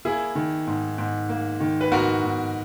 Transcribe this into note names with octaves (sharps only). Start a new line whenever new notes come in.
A#3 E4 G#4
D#3
G#2
G#2
A#3
D#3
B4
G#2 F#4 A#4
G#2